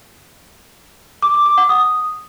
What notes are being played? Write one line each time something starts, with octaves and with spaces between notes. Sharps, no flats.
D6
D6
D6
F#5
D#6